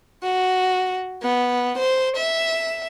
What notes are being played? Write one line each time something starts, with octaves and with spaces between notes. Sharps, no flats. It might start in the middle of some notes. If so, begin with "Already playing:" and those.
F#4
B3
C5
E5